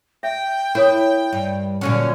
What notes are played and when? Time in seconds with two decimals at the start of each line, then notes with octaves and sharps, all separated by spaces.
0.23 E5 G5
0.75 E4 A#4 C#5 D#6
1.33 G2
1.81 A#2 D3 F#3 C#4